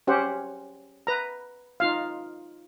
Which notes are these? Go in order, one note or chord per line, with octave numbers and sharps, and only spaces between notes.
C#4 G4 C5 F#5
B4 A#5
D#4 F4 F5